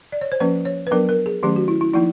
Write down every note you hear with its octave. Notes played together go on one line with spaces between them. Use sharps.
D5
C#5
C5
F3 A#3 C#4 B4
C#5
B4
F#3 B3 D4 A#4
A#4
G#4
D#3 F#3 A3 C#4 G4
F#4
E4
E4
F3 A#3 D#4 E4